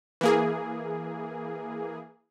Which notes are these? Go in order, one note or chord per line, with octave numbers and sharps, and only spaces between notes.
E3 A#3 G#4